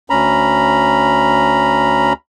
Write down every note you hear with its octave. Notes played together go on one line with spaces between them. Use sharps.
D2 C#4 A#5 B5